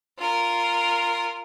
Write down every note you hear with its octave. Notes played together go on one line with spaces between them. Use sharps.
F4 A#4